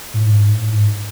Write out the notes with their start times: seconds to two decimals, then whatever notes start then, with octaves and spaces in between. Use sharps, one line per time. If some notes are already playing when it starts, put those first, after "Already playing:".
0.14 A2
0.26 G#2
0.49 A2
0.72 G#2